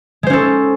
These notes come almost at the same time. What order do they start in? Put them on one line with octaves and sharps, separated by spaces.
G#3 C5 C#4 A4